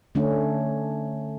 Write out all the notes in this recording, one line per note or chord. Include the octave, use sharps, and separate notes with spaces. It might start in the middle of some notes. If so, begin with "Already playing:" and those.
D3 A3 C#4 D4